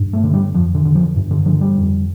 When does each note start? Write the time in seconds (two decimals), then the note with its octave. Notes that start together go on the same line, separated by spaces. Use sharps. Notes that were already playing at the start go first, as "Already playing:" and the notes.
Already playing: G2
0.13 A3
0.24 D3
0.34 G3
0.54 F2 F3
0.75 D3
0.85 D3
0.95 F3
1.16 G2
1.31 D3
1.46 D3 F3
1.61 G3
1.77 F2